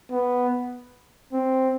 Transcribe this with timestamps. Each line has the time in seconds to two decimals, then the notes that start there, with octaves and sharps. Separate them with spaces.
0.11 B3
1.33 C4